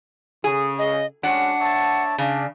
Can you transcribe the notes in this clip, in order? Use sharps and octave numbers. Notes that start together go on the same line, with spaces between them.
C#3 G#4
D#5
G#3 C#4 D4 F#4 F#5
C#5 E5 A5
C#3 D4